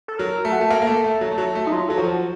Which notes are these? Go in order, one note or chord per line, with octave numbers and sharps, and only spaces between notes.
A4
F#3 A#4
A3 A4
F#4
A3 A4
A#3
A#3
A3
A3
F#3
A3
F#3
A3
D#4
F#3 F4
F#3 A4
F3 F#4